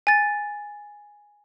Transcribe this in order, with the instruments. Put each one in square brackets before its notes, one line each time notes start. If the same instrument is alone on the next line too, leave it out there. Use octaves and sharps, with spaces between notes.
[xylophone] G#5 A6